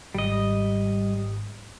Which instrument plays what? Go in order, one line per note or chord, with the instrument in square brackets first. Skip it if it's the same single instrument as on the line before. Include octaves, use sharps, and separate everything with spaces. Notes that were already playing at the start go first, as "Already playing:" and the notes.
[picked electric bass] G#1 [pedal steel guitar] G3 D#5